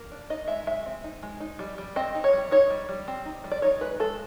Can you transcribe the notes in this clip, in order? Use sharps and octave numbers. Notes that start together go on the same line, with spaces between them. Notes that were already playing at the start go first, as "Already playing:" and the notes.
Already playing: A#3
D4
D#4 D#5
G#3 E5
G#3 E5
C4
D#4
G#3
D#4
G3
G3
C4 D#5
D#4
C#5
G3
D#4 C#5
G3
G3
C4
D#4
G3
D5
D#4 C#5
G#3 B4
G#3 A4